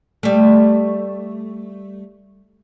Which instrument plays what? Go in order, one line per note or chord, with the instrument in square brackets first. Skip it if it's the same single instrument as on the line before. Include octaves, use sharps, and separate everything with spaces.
[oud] G3 A3